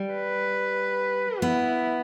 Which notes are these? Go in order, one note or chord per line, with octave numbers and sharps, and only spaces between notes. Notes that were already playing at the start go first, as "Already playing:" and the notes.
Already playing: G3
B4
B3 E4